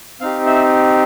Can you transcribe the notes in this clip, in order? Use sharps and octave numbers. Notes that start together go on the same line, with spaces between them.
C4 D#4 G4 F5
E5